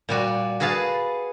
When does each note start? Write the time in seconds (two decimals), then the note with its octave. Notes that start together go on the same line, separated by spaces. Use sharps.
0.09 A#2 G3 F#4
0.60 F#4 G#4 B4 F5 A5